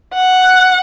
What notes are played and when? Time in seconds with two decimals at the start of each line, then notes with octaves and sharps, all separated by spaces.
0.14 F#5
0.43 F#6